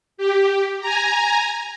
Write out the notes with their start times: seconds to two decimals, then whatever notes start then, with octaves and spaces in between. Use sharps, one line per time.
0.17 G4
0.80 G#5 A#5